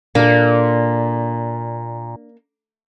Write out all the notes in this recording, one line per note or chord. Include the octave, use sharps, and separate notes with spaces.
A#2 A#3 D4 A4